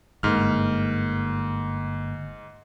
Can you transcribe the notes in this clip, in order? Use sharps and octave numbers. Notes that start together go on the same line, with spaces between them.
G1 G#2 A#3 F6